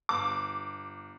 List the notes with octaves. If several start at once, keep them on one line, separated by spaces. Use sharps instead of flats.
G1 D6